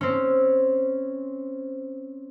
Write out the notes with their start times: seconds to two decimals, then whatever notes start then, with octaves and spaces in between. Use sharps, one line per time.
0.01 C4 C#4